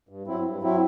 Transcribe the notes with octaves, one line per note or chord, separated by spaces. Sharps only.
G2
F#3 C4 E4
G2
F#3 C4 E4